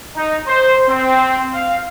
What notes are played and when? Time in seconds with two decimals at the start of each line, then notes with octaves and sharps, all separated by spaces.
0.16 D#4
0.47 C5
0.89 C4
1.53 F5